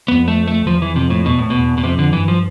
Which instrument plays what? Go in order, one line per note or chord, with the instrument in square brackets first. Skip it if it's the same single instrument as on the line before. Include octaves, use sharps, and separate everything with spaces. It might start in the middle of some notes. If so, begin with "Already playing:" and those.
[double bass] F2 [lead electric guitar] B3
[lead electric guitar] A3
A3
[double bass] E2 [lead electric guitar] F3
[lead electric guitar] E3
[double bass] F2 [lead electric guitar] C3
[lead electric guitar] A2
[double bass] E2 [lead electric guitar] B2
[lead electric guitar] A2
[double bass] E2 [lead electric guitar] B2
[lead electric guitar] B2
[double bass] F2 [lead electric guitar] C3
[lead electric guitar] D3
[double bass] G2 [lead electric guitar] E3
[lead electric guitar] F3